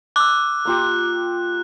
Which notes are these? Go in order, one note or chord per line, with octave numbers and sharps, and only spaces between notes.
D6 E6 F#6
A#3 F4 G4